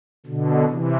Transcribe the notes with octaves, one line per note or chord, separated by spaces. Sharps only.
B2 D3
C3 E3